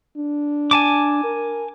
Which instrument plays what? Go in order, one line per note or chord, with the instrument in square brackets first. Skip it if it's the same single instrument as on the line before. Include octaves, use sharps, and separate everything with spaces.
[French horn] D4
[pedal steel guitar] G#5 A5 D6
[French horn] A#4